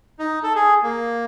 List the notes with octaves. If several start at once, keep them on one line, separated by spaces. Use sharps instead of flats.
D#4
A4
G#4
A#3